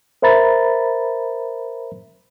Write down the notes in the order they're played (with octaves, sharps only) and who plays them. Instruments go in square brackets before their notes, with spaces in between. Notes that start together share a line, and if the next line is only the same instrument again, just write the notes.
[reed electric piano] A#4 C5 E5 A#5 B5 A6